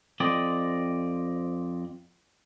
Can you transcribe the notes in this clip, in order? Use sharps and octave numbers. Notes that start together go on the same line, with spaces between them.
F2 C4 D5 D#5